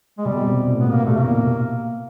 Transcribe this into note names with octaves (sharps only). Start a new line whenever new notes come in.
G#3
B2 G3
C3
B2
A2
A#2 B3
A#3
C3 A3
B2 A#3
A#2